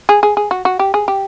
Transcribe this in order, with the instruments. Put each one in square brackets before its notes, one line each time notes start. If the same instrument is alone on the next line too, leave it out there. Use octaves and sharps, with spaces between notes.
[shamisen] G#4
G#4
G#4
F#4
F#4
G4
G#4
G4